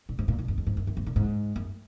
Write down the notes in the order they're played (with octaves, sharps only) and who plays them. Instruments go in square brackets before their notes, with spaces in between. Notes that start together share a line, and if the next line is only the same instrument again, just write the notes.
[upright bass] A#2
G#2
A#2
B2
F#2
F2
G#2
F#2
F#2
G#2
A#2
G#2
F#2